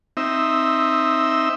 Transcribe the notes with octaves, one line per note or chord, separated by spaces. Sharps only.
C4 D#4 E5